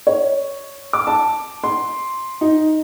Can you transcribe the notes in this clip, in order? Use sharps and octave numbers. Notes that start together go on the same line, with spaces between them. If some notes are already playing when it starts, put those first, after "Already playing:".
C#5
D6
A5
C6
D#4